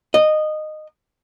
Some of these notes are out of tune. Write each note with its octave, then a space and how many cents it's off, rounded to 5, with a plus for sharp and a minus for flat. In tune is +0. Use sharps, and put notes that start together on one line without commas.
D#5 -15